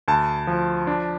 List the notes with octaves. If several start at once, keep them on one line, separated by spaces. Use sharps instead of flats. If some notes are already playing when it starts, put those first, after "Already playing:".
D2 A5
F3
D4